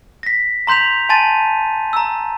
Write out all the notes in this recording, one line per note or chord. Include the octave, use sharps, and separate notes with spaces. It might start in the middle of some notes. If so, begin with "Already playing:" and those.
A#6 B6
A#5 C6 G6 B6 F7
G#5 A5 C6 A6 D#7
A#5 E6